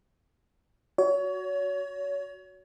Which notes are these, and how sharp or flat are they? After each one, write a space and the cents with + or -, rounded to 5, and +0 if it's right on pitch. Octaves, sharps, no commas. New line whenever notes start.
F#4 +0 C#5 +30